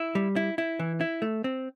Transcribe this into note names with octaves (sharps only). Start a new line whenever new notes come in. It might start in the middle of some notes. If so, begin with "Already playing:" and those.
Already playing: E4
G3
E4
E4
E3
E4
A3
C4